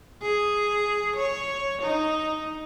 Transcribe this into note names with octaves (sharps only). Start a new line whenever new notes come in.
G#4
C#5
D#4